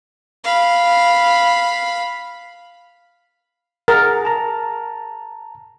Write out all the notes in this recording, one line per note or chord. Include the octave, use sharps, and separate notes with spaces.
F5 B5
G#4 A#4 F#5 A6
A5 A#5